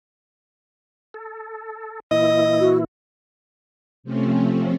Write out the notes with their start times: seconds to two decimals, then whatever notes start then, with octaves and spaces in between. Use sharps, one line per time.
1.14 A4
2.11 A#2 E3 E4 D#5
2.60 F#4
4.04 C3 F3 A3 C4 C#4